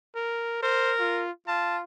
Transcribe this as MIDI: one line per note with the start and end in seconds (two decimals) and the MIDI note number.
0.16 0.58 70
0.63 1.23 70
0.63 0.94 72
1.00 1.31 65
1.48 1.81 65
1.48 1.77 81